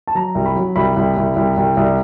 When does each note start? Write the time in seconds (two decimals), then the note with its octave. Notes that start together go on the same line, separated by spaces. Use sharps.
0.07 A5
0.15 F#3 A#5
0.35 C2
0.46 B5
0.55 F#3
0.76 C2 B5
0.97 C2
1.17 C2
1.36 C2
1.57 C2
1.77 C2